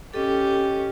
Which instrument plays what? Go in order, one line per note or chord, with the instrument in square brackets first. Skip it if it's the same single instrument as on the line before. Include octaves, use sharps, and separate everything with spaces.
[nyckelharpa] C#4 G4 [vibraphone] A4 D#5